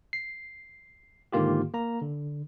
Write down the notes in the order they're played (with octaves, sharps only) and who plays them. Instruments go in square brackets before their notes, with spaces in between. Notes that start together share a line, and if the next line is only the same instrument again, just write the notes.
[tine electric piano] C7
G#2 D3 D#3 A#3 F4 G4
A#3 A#5
D3